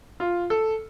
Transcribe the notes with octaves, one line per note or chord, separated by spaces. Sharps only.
F4
A4